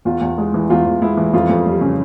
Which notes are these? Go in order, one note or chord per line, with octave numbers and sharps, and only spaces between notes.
E2 F4
E2
G#3
E3
E2 F4
E2
G#3 E4
E3
F2 F4
F2
G3
C#3